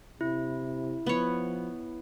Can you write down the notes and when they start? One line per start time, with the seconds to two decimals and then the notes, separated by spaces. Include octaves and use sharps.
0.21 C3 E4
1.06 F3 B3 C#5